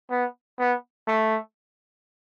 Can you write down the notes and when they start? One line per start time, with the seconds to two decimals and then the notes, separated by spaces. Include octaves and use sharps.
0.10 B3
0.59 B3
1.08 A3